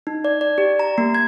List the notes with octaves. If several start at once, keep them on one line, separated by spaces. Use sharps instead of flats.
D#4
D5
D5
G4
A#5
A#3
G#6